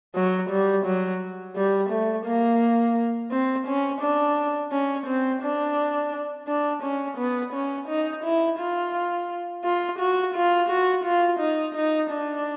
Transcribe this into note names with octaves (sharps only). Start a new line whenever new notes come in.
F#3
G3
F#3
G3
A3
A#3
C4
C#4
D4
C#4
C4
D4
D4
C#4
B3
C#4
D#4
E4
F4
F4
F#4
F4
F#4
F4
D#4
D#4
D4